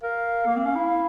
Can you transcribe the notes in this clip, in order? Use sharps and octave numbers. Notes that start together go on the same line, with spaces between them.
A#4 F5
A#3
C4
C#4
E4